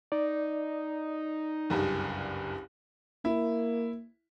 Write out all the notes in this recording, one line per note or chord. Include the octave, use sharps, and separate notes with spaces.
D#4 D5
F#1 C2 G2
A#3 E4